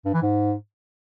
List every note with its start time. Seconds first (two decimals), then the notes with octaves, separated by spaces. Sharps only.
0.05 G2
0.14 E3
0.22 G#2